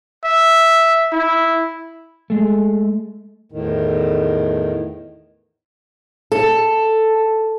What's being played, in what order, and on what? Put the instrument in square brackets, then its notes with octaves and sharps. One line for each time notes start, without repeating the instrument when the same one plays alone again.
[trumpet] E5
E4
[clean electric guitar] G#3 A3
[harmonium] E2 A2 D#3
[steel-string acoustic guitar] A4